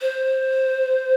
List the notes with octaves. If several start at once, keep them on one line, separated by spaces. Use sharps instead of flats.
C5